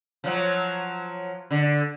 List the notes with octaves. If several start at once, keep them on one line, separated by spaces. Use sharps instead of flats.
F3 F#3
D3